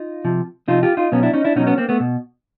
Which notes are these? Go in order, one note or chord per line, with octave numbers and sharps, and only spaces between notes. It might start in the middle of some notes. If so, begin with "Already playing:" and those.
Already playing: D#4 F4
C3 F3
C3 F3 D#4 F4
F4 G4
D#4 F4
B2 F#3 B3 C#4
D4 E4
C#4 D#4
D4 E4
B2 F#3 C#4 D#4
B3 C#4
A#3 C4
A3 B3
B2